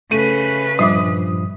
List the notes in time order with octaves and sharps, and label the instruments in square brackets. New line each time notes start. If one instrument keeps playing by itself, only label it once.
[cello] C#3 B4 [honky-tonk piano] A3 D#7
[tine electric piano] G2 A#2 F3 [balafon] G3 E5 D6 [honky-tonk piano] D#6